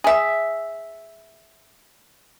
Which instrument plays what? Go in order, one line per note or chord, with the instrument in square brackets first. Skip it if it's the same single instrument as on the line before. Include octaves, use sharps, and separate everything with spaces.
[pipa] G#4 E5